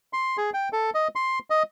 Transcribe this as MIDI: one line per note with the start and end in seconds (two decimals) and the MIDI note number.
0.13 0.37 84
0.37 0.50 68
0.54 0.69 79
0.73 0.90 69
0.94 1.08 75
1.16 1.39 84
1.50 1.63 75